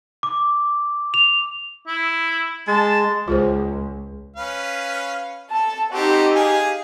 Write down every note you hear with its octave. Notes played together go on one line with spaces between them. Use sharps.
D6
F7
E4
G#3 A5
C#2 F4 G#4 C5
C#4 B4 F5
A4 A5
C4 D#4 F#4 G4 A4
G#4 F5 G#5